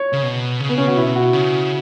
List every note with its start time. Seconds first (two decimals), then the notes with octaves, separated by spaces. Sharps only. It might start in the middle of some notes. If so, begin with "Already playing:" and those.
Already playing: C#5
0.13 C#3
0.23 B2
0.60 C#3
0.69 B3
0.78 C#4
0.88 C#3 F#4
0.96 B2 E4
1.16 F#4
1.33 C#3